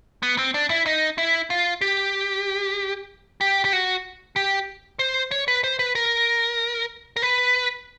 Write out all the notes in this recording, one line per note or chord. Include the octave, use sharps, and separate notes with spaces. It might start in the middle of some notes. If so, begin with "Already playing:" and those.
B3
C4
D4
E4
D#4
E4
F4
G4
G4
G4
F#4
G4
C5
C#5
B4
C5
B4
A#4
A#4
B4